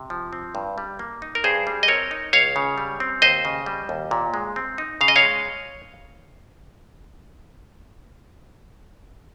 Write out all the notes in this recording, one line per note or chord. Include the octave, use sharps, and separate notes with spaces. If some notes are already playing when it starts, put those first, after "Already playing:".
Already playing: C3
F3
C4
G2
G3
A#3
D#4
A#4
G2 G#4 C5
G3
D#5
C4 A#4 C#5
D#4
C#2 C#5 F5
C#3
G3
C4
D#2 C5 D#5
C#3
G3
D#2
A#2
G#3
C4
D#4
C#3 F5
D#5
C#5 F5
G#3